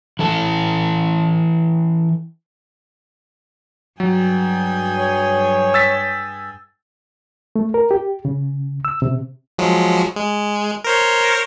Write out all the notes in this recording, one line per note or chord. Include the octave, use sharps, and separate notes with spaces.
E3 E4 A4
G2 F#3 G#4 G5
C#5
E6 A6 B6
A3
A#4
G4
C#3
E6
C3
F3 F#3 G#3
G#3
A#4 C5 C#5